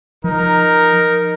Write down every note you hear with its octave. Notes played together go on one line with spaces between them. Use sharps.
F3 D#4 A#4